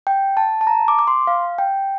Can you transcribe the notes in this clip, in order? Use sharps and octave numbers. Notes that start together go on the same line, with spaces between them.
G5
A5
A5
A#5
D6
D6
C6
F5
G5